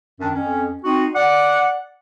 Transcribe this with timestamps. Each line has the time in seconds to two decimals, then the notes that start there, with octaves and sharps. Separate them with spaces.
0.20 F#2 D#3 D4
0.35 F2 C#4
0.84 C4 D#4 F#4
1.15 D5 F#5